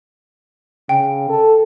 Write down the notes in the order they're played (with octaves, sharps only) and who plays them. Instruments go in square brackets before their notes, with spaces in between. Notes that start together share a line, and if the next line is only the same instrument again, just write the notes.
[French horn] C#3 [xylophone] G5
[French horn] A4